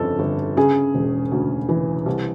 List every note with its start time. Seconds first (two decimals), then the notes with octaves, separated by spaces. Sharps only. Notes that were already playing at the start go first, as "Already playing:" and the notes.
Already playing: G1 F2 C#3 A4
0.19 G1
0.57 C#3 G#4
0.94 E1
1.32 D2
1.69 E3
2.06 C2